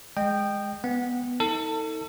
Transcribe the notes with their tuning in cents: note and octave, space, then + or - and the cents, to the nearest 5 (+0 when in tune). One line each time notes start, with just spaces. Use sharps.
G#3 +0 D#5 -25 G5 +0
B3 +0 F#5 -15
D#4 +40 A4 +30